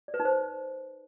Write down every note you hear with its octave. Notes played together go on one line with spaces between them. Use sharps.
D5
B4
D#4
C5